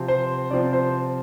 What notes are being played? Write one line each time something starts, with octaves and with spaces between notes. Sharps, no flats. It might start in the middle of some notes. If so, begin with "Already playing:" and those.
Already playing: C3 F3 C4
C5
C3 F3 C4 D5
C5